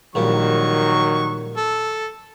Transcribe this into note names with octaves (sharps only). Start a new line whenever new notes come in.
A#1 A#2 D#3 F#3 G3 C#6
A4